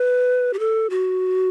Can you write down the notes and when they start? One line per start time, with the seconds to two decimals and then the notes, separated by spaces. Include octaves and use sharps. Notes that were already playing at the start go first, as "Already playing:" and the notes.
Already playing: B4
0.53 G4
0.59 A4
0.90 F#4